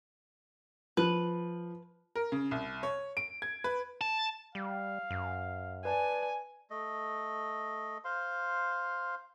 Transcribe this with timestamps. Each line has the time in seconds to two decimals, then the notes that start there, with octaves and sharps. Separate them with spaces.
0.97 F3 B4
2.16 A#4
2.32 C#3
2.51 C2
2.83 C#5
3.17 D7
3.42 G#6
3.64 B4
4.01 A5
4.55 G3 F5
5.10 F#2
5.85 B4 D5 G#5 A5
6.70 A3 D#5
8.05 C5 F5 C6